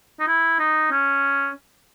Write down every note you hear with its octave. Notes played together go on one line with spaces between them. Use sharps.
D#4
E4
D#4
C#4